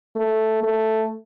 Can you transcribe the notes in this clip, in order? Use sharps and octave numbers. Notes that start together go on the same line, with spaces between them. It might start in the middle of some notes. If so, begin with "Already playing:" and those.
A3
A3